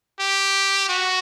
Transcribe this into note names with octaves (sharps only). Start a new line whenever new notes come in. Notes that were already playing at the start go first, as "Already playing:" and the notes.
G4
F#4